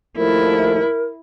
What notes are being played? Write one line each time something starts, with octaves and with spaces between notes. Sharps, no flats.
D#2 F3 A3 E4 A#4